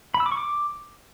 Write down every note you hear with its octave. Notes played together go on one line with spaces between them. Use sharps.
B5
E6
D6
C#6
D6